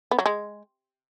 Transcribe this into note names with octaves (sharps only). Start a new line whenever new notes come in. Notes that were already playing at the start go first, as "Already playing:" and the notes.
B3
F#3
G#3